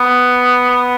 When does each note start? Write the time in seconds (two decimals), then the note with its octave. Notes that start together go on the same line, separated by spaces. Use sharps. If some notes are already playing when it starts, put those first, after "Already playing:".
Already playing: B3
0.70 B3